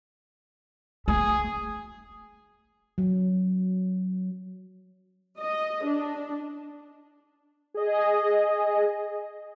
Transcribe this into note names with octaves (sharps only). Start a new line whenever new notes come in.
A3 G#4
F#3
D#5
D4
G#4 D#5